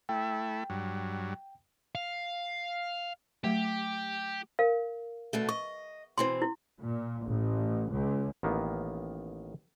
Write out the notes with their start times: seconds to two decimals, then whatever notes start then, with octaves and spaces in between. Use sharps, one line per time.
0.09 A3 E4 G5
0.70 G2 F#3
1.95 F5
3.44 F#3 A3 G4
4.59 A#4 F5
5.33 B2 D3 A3
5.49 D#5 C#6
6.18 B2 E3 C4 C6
6.42 E4
6.81 A#2
7.26 A1
7.91 C#2
8.43 A1 D#3 A#3 B3